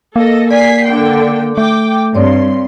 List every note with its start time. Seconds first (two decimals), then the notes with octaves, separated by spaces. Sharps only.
0.16 A#3 A4 D#5
0.51 D5 G#5 G#6 B6 C7
0.86 D3 G5
1.58 A3 G5 D6
2.15 G2 C4 C#5 D5 C6